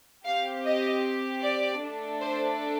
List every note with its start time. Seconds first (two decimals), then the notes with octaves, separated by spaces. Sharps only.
0.25 C4 G4 F5
0.64 D#5
1.42 D5
1.81 A3 D4 A4
2.20 C5